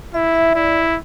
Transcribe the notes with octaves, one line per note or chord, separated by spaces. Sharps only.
E4 E5
E5
E4 D5